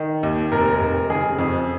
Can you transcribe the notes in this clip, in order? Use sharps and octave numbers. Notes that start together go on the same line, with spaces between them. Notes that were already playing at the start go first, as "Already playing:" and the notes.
Already playing: D#3
D#2
F1 A#4
F1
C#3 G#4
F2